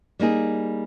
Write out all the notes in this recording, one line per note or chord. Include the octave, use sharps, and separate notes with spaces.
G3 A#3 D#4 G#4